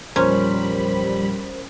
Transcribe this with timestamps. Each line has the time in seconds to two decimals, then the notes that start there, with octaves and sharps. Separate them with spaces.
0.16 E2 A#2 F3 G3 C#4 A#4 C5 B5